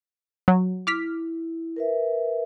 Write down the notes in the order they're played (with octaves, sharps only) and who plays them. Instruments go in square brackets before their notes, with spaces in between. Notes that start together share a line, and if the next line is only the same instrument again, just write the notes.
[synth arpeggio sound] F#3
[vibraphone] E4 [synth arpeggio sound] D6 F6 B6
[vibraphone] A#4 B4 E5